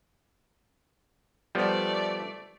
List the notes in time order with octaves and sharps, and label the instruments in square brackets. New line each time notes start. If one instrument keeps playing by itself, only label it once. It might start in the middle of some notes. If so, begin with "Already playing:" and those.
[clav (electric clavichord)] F3 G3 B3 [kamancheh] A3 D5